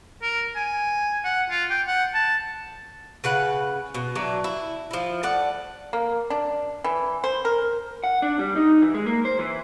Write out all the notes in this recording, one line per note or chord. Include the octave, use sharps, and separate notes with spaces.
A#4
G#5
F#5
F4
G5
F#5
A5
C#3 B4 F#5
B2
E3 F#3 D4
E4
F3 E4
A3 D5 F#5
A#3
D4
E3
C5
A#4
F#5
D4
G3
D#4
E3
G#3
A#3
C5
E3